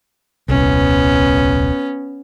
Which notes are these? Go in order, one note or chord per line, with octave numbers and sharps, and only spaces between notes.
D#1 C2 B3 C#4